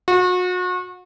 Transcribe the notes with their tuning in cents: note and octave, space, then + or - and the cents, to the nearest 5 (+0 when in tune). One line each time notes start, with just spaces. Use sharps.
F#4 -35